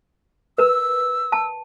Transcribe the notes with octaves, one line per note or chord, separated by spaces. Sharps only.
A#4 B4 E6
A5